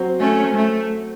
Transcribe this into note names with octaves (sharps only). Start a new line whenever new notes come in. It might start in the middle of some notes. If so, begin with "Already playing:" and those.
Already playing: F#3 C4 F#4 C5
A3 C#4
A3